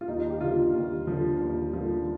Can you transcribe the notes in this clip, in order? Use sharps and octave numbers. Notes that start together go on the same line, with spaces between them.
F4
D#2 D#4
G4
D3 F3 F4
D#2
D3 F3
D#2
D3 F3